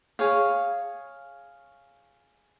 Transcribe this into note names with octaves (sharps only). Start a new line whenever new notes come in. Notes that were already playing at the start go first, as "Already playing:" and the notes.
G#4 C#5 F5